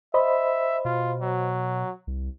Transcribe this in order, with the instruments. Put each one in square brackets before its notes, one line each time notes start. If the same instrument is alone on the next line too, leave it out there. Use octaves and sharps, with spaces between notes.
[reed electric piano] C5 D#5 B5 [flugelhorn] E5
[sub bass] B2 [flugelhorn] F4
[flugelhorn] F#3
[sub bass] C2